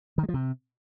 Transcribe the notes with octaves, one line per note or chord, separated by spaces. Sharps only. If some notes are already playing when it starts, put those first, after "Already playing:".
D#3
G#3
F3
C3